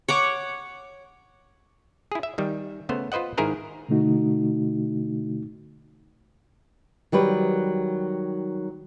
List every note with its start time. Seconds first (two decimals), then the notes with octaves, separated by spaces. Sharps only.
0.08 C#5 F#5 D6
2.12 E4 G#4
2.23 E5
2.38 D#3 G3
2.89 C#3 A3 B3 C5
3.12 F4 B4 C5 D#5 F#5
3.37 G#2 D#3 E4 G#4 A#4 C5
3.89 B2 D3 A3 D#4 F#4
7.12 D#3 F#3 G3 B4